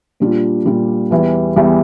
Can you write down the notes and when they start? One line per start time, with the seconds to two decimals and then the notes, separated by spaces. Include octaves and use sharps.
0.20 A#2 G3 D4 F4
0.66 A#2 G3 D4 F4
1.11 E2 E3 G3
1.56 E2 E3 G3